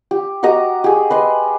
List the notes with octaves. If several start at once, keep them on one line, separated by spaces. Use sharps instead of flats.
G4
F#4 G4 D#5 A#5
G4 G#4
B4 D#5 C6